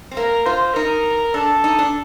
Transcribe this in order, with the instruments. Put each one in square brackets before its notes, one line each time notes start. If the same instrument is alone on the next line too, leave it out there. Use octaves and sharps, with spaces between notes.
[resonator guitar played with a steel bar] C4
[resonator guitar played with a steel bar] A#3 [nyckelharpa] A#4
[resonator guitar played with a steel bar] F4 [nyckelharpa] C5
[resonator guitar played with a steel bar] D#4 [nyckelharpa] A#4
[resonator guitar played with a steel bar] D4 [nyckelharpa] A4
[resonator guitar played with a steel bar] D#4
D4